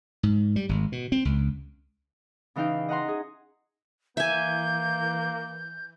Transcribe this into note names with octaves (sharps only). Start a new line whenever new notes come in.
G#2
G3
G#1
B2
C4
C#2
C#3 E3 D#4 F5 G5
D#5 F#5 A#5 C6
G#4
E3 A#3 E5 G#5 G6